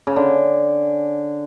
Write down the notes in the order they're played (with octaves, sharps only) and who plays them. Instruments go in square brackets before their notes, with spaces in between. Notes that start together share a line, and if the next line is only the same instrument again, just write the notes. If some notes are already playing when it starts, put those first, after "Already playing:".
[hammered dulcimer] C#3
D3